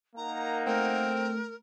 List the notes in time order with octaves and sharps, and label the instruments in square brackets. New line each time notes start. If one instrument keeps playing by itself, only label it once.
[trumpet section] A#3 D#4 F#5 [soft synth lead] A#4 [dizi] A#5
[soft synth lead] A3 [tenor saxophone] C4 [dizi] A#4